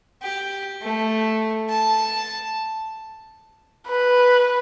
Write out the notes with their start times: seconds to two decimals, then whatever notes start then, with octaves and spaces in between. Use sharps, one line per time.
0.22 G4
0.82 A3
1.69 A5
3.88 B4